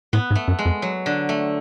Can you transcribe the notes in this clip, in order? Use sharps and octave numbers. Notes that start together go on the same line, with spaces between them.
A2 B3
G#2
A3
F#2
G#3
F2
F#3
D3
A3